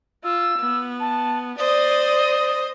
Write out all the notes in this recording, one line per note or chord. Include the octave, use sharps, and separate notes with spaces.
F4 E6
B3
A5
C5 D5 D#5 D#6